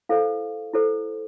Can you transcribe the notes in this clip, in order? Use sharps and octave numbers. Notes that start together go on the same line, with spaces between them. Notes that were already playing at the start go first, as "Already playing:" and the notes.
E4 A4 C5 F5
E4 A4 C5